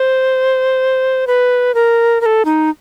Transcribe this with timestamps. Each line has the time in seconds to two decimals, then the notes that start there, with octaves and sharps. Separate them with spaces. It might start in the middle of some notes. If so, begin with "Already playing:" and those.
Already playing: C5
1.27 B4
1.74 A#4
2.21 A#4
2.26 A4
2.45 D#4